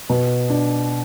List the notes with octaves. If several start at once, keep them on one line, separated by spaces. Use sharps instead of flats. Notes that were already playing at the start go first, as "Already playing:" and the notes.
B2
D4